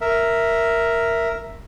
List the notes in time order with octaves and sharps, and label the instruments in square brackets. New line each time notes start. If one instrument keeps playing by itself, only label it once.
[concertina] A#4 E5